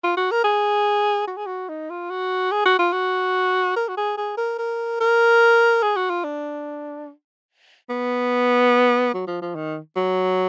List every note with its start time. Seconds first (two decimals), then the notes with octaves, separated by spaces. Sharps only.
0.03 F4
0.17 F#4
0.31 A#4
0.44 G#4
1.27 F#4
1.37 G#4
1.46 F#4
1.69 D#4
1.90 F4
2.10 F#4
2.51 G#4
2.65 F#4
2.79 F4
2.93 F#4
3.76 A#4
3.88 F#4
3.97 G#4
4.17 G#4
4.37 A#4
4.58 A#4
5.00 A#4
5.83 G#4
5.96 F#4
6.10 F4
6.24 D4
7.89 B3
9.14 F#3
9.27 F3
9.42 F3
9.55 D#3
9.96 F#3